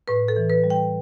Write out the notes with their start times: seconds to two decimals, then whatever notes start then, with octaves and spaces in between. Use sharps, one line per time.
0.08 A2 B4
0.28 A4
0.36 E3
0.50 B4
0.64 G3
0.70 G5